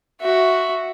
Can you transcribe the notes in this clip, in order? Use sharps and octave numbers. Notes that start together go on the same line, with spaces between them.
F#4 E5